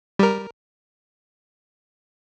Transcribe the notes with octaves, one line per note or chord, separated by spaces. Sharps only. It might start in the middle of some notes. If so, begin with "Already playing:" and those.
G3 A#4